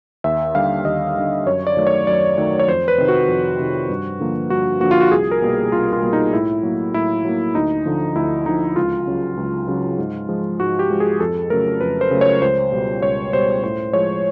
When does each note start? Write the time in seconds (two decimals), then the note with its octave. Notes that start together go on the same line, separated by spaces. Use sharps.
0.24 D#2 E5
0.55 D3 G3 F5
0.85 D#2 D#5
1.16 D3 G3
1.46 F#2 C#5
1.67 D5
1.77 D#3 F#3 A3
1.87 C#5
2.07 F#2 D5
2.37 D#3 F#3 A3
2.59 C#5
2.68 F2 C5
2.88 B4
2.98 C3 D#3
3.08 F#4
3.28 F2
3.59 C3 D#3
3.89 G2
4.20 D3 F3 A#3
4.50 G2 F#4
4.80 D3 F3 A#3 F#4
4.91 F4
5.00 F#4
5.11 C2 G#4
5.31 A#4
5.42 B2 G3 A#3
5.72 C2 F4
5.93 F4
6.02 B2 G3 A#3
6.13 D#4
6.33 A2 E4
6.63 F#3 A#3
6.94 A2 E4
7.25 F#3 A#3
7.55 D2 D#4
7.85 D3 F3
8.16 D2 E4
8.46 D3 F3 D#4
8.76 C#2 F4
9.07 C#3 F#3
9.37 C#2
9.68 C#3 F#3
9.98 G#2
10.29 F3 G#3
10.60 G#2 F#4
10.79 G4
10.90 F3 G#3
11.00 G#4
11.20 F2 A4
11.50 C#3 F#3 A3 A#4
11.81 F2 B4
12.01 C5
12.11 C#3 F#3 A3
12.21 C#5
12.42 C#2 C5
12.72 B2 G3
13.03 C#2 C#5
13.33 B2 G3 C5
13.64 A2 C5
13.93 F3 G#3 C#5